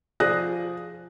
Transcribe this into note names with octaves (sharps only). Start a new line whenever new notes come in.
F3 G#4 D5 D#6 F#6 A#6